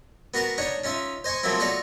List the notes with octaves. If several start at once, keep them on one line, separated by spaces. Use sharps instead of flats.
B3 F#4 A#4 F#5 A5
D4 D#4 C#5 F#5
C#4 D#4 F4 E5
C5 D#5 G#5 C6 C#6
F3 F#3 A3 A#3 C4 E4
F4 F#4 A4 D5 D#5 F5